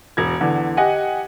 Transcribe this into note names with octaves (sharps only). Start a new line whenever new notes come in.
E1 G#6
E2 D3
G4 D#5 F#5 G#5